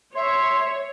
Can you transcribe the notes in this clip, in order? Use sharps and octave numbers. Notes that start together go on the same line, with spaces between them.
C#5 E5 C6